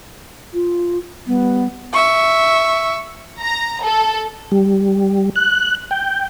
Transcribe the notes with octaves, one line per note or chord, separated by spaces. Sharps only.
F4
G3 B3
E5 C#6
A#5
A4
G3
F#6
G5